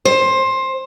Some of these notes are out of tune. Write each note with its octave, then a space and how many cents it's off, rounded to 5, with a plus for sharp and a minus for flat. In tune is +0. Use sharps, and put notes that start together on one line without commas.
C5 +15